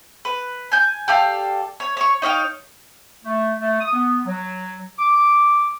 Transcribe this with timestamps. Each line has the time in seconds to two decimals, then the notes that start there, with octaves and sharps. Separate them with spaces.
0.25 B4
0.72 G#5 G6
1.08 G4 A4 D5 F5
1.80 C#5
1.97 C#5 C#6
2.22 D#4 C#5 F5 G5
3.25 A3
3.60 A3
3.80 D#6
3.93 B3
4.26 F#3
4.99 D6